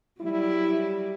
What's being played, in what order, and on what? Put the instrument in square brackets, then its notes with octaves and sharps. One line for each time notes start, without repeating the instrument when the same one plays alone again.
[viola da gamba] F#3 G3 [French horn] E4